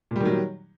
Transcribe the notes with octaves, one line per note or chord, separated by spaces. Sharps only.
A#2 D#3 F#3 G3